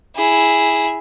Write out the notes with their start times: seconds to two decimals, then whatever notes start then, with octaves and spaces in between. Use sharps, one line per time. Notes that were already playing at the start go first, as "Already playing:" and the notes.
0.16 E4 G#4